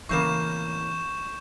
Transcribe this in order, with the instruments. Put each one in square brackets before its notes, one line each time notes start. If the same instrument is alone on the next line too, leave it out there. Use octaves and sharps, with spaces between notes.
[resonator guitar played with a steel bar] A2 C#3 A#3 [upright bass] E3 C4 [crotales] C#6 G6 E7